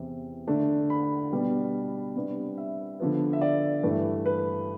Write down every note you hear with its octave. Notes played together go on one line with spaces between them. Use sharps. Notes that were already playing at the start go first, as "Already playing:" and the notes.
Already playing: E2 C3 E3
D3 A3 D4
B5
B2 G3 B3 D4
C3 G3 B3 D4
E5
D3 F3 B3
E5
D5
G2 E3 A3
B4